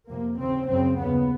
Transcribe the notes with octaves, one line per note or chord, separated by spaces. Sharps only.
F2 C3 A#3
D#2 C#3 C4
F#2 C#3 C4
D#2 C#3 B3